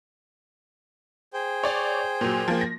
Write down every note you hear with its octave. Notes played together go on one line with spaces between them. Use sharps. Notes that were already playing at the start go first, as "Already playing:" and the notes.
G#4 C5 G5
C#5 D5
A#2 F#3
F3 A#3
A#6